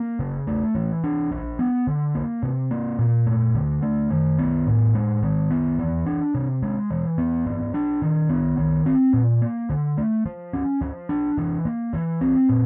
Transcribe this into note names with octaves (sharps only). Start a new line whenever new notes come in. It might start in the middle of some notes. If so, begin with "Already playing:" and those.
Already playing: A#3
C#3
A3
E3
D4
F3
B3
D3
A#3
C3
A#3
A#2
A3
D3
A3
D#3
B3
A2
G#3
D#3
B3
E3
D4
C3
G#3
E3
B3
F3
D4
D#3
B3
D#3
C4
A#2
A#3
D3
A3
F3
C#4
F3
D4
E3
A#3
E3
C4
A#2